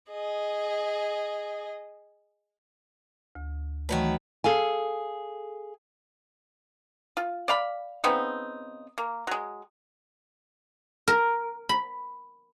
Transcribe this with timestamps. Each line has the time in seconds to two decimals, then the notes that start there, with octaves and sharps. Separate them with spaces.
0.11 G#4 D#5
3.35 D2
3.89 D#3 E3 F#3 A3 B4
4.44 G#4 A4 F5 G#5
7.17 F4
7.48 D5 F5 B5
8.04 C#3 B3 C4 D#4
8.98 A#3
9.27 F#3 G#3
11.08 A#4
11.69 B5